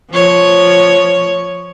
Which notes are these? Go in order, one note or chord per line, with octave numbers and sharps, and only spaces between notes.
F3 C#5